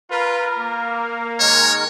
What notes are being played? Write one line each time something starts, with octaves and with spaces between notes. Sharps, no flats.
F4 A#4 B4
A#3
D#3 G#3 A#4 C#5